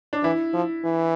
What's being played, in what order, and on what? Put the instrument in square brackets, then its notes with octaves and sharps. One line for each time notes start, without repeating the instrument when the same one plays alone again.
[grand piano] D4
[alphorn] E3 [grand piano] E4
[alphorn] F3
E3